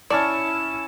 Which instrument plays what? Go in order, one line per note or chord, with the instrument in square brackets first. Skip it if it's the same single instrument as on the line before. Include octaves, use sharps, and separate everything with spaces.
[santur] C#4 A5 C#6 [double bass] E4 [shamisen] D5 [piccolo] E7